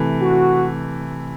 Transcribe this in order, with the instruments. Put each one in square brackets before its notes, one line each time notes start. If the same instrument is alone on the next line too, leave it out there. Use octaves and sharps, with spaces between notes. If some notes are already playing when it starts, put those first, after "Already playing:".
Already playing: [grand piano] C3 E3 A3
[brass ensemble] F#4